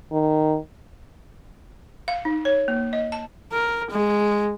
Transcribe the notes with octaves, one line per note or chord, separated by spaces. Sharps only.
D#3
F5
D#4
C#5
A#3
D#5
A5
A#4
G#3